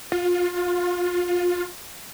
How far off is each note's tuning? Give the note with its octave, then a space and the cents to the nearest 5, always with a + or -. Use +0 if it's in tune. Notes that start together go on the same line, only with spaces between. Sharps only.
F4 +25